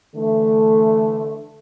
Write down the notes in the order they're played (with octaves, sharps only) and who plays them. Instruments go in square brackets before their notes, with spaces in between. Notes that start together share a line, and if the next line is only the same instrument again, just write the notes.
[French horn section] D3 E3 A3